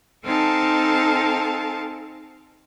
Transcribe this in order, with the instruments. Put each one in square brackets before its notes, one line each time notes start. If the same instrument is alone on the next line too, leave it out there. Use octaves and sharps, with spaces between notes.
[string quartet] C4 D#4 A4 F5 G#5 A5